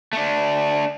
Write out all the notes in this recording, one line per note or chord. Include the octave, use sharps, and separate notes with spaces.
A3 D4